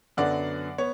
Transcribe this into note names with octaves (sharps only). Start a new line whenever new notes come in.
F#2 D3 F#3 B3 D5 F#5
B3 C#5